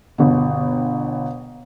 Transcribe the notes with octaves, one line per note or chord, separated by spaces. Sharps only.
G1 B2